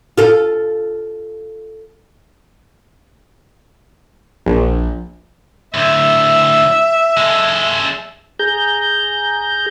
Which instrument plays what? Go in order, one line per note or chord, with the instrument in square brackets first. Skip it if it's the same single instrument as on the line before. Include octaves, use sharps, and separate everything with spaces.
[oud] F4 A4
[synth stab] A#1
[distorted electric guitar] D2 A2 [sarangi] E5
[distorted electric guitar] G#3 A4
[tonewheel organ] G#4 A#5 G6